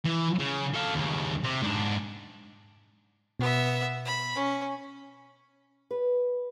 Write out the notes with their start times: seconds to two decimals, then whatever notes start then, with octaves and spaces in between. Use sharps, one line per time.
0.05 E3
0.39 C#3
0.74 A4 F5
0.95 D#2 C#3
1.44 C3
1.62 G#2 D4
3.39 B2 B3 E5
4.05 B5
4.35 C#4
5.91 B4